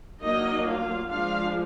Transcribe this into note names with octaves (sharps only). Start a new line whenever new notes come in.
F#3 A#3 D4 D#4 D#5
F4 F5
F3 G#3 D4 F4 F5